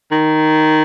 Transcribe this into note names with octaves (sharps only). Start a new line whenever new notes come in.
D#3